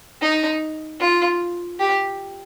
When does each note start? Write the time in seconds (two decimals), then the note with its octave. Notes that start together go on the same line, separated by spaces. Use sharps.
0.22 D#4
1.01 F4
1.79 G4